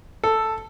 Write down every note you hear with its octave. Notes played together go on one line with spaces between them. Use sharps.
A4